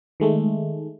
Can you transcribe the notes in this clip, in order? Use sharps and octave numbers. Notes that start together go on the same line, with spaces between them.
D#3 G#3 A3